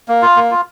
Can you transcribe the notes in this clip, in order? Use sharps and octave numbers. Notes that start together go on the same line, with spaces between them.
A#3
F4
A#3
F4